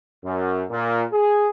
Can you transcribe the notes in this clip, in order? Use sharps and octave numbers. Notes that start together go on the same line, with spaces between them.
F#2
A#2
G#4